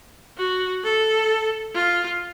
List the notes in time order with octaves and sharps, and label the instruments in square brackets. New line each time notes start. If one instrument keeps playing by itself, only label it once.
[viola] F#4
A4
F4